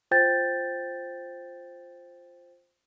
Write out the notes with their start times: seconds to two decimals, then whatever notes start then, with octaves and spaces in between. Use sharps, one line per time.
0.11 F4 C5 G5 G6 A6